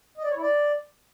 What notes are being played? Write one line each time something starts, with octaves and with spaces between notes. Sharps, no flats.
D#5
D5
C#5
E4
D5